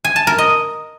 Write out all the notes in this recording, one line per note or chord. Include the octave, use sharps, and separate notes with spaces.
G#5
A5
A#4
D#5